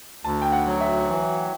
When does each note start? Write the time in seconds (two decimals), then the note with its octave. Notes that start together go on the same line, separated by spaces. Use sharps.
0.24 D2 A5
0.42 G5
0.52 F#5
0.66 F#3
0.80 E5
1.09 E3